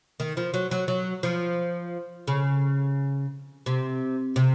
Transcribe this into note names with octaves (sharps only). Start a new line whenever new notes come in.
D#3
F3
F#3
F#3
F#3
F3
C#3
C3
C3